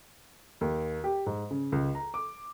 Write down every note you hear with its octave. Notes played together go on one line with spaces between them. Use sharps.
D#2
G4
G#2
C#3
C#2
A#5
D6